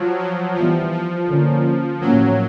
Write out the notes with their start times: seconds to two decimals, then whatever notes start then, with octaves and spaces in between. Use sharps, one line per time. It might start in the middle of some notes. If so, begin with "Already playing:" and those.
Already playing: F3 F#3
0.18 F3
0.55 E3 F3 G3 B3
0.92 F3
1.28 D3 F3 A#3 C#4
2.01 A2 F3 F#3 A#3 C#4